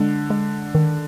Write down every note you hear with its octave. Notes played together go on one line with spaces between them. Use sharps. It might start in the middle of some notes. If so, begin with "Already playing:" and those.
Already playing: D3 G#3
G#3
D#3